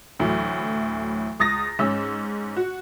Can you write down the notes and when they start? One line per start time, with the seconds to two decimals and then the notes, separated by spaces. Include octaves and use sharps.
0.19 D2 A2 E3 F#3
1.40 C#2 D#6 A6 A#6
1.79 G#2 C#4 E6
2.57 F#4